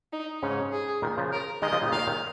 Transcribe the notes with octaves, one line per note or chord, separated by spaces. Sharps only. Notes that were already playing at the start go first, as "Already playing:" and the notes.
D#4
G#2 C#3 C#4
G#4
A#2 D#3
C#3 F3
A#4
D#3 G#3 D#5
C#3 F3
A#2 D#3
C#3
A#2 D#3 F5
A#2 D#3